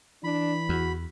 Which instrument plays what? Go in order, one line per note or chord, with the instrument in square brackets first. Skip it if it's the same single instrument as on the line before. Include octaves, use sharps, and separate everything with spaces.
[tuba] E3 [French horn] D4 [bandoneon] B5
[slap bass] E2 [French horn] F#4